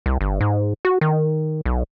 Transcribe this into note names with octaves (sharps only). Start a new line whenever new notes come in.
C2
G1
G#2
F#4
D#3
B1